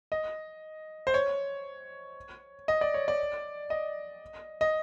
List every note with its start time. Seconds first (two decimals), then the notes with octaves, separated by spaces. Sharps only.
0.12 D#5
1.07 C5
1.14 C#5
2.68 D#5
2.81 D5
2.94 C#5
3.08 D5
3.70 D#5
4.61 D#5